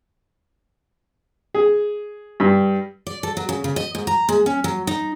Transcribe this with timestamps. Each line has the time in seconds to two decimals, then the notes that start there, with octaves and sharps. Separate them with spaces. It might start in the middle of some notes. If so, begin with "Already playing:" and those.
1.54 G#4
2.40 G2
3.07 D5
3.23 A4
3.37 F#3
3.49 C#3
3.64 C#3
3.76 D#5
3.95 G#2
4.07 A#5
4.29 G#3
4.46 C#4
4.64 F#3
4.87 D#4